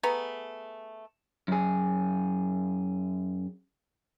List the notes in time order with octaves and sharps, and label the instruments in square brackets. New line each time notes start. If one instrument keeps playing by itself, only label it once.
[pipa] A3 B3 G#4 A#5
[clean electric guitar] F#2 G#4